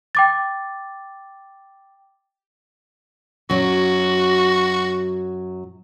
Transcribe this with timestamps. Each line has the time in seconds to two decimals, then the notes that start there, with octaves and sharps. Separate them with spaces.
0.15 G5 D6 A6
3.50 F#2 F#3 F#4